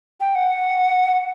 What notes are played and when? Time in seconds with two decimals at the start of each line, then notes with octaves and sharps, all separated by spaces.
0.20 G5
0.35 F#5